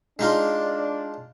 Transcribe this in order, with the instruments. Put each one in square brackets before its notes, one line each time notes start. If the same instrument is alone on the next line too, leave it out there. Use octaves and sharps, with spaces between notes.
[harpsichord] G#3 D#4 F4 [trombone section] D4